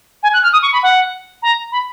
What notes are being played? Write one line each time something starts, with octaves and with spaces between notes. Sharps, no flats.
G#5
F#6
F6
D#6
C#6
B5
F#5
A#5
B5